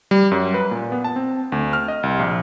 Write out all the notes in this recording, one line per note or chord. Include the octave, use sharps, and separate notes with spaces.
G3
F#2
B4
A#2
B3
A5
C4
D2
F6
D#5
C2
A#1